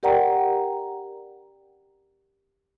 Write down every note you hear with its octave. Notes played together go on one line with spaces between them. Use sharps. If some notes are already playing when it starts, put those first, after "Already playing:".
G4 A#4 D5 F#5 G5 A#5